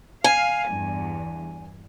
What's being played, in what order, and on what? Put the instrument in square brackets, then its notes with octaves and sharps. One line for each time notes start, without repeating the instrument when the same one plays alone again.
[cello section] F5 [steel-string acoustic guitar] G#5
[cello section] E2 G2